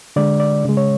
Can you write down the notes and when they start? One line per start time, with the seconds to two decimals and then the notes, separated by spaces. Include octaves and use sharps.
0.16 D3 G#3 D5
0.40 D5
0.65 C#3 G#3
0.77 C#5